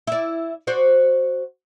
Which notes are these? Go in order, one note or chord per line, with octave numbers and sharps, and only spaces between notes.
E4 D5
F#4 C5 D5